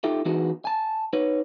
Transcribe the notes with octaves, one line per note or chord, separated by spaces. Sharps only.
D#4 F4 G4 A4 E5
E3 B3 D#4 F#4 G#4
G#5 A5
D#4 B4 C#5